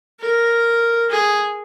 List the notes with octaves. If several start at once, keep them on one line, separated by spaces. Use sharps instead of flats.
A#4
G#4